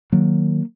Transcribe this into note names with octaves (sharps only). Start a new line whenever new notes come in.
D#3 F#3 A#3